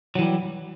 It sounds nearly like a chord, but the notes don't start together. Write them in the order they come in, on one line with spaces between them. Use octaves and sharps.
F#3 E3 G3